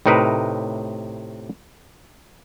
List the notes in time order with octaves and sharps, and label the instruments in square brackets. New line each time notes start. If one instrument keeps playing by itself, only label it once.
[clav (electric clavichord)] A2 C3 D#4 A#4 B4 E5